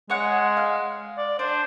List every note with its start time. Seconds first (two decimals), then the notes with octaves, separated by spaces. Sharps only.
0.10 G#3 C#5 F#5
0.57 F5
1.18 D5
1.39 D4 C5